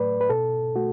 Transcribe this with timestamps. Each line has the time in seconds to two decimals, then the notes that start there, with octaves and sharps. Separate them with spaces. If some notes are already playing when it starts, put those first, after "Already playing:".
Already playing: A2 F#3 A3 B4 D5
0.21 B4
0.29 B2 A4
0.76 A3 F#4